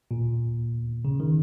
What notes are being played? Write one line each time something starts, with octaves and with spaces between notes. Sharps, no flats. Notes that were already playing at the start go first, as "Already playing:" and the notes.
A#2
C#3
D#3